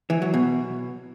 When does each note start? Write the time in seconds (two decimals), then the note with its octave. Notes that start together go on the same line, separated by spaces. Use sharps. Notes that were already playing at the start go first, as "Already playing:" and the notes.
0.10 E3
0.22 F#3
0.34 B2